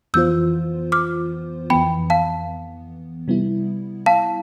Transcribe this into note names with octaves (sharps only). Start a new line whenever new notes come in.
F2 E3 B3 F4 C5 E6 G6
D6 F6
F2 E3 B3 G5 B5
F5 A5
C3 G3 B3 E4
F5 A5